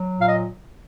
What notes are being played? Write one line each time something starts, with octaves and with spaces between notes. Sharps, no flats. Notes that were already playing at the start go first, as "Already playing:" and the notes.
Already playing: F#3
A#2 F5
D#5